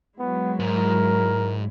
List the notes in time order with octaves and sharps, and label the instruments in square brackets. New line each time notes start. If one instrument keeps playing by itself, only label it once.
[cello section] F#3 G#3 E4 [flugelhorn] B3
[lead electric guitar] G#2 [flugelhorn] A#4